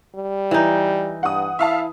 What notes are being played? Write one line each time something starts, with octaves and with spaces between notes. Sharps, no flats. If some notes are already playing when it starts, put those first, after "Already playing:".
G3
E3 D#4
G2 F#5 D#6
E4 E5 F5 A5